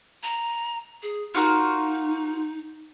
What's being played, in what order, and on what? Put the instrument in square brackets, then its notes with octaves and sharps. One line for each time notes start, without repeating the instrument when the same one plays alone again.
[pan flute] A#5
G#4
[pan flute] D#4 [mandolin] F4 F#4 A#4